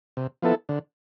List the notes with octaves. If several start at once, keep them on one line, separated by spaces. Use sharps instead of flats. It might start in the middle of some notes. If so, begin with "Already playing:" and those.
C3
F3 B3 E4 A4
D3